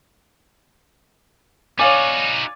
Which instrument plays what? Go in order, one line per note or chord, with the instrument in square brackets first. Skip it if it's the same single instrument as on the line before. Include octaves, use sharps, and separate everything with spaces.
[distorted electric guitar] D#4 F#4 [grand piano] C#5 F5 G#5 [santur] D5